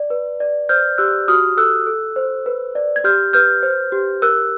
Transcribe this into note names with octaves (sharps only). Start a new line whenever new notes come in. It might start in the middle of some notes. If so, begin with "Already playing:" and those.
Already playing: D5
B4
D5
C5 F6 G6
G4 E6 F#6
F#4 D#6 F6
A4 E6 F#6
A4
C5
B4
D5
G#6
G4 F6 G6
B4 F6 G6
C5
G4
A#4 E6 F#6